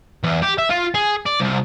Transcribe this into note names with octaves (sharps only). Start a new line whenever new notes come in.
E2
G4
E5
F4
G#4
D5
C2